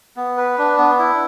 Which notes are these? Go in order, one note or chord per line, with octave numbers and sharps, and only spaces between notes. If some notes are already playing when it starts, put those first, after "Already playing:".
B3
B4
D4
B3
E4